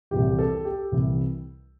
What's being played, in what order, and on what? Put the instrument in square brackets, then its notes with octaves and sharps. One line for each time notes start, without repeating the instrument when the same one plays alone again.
[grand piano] C2 C3 E3 G3 G4
A4
G4
C2 C3 E3 G3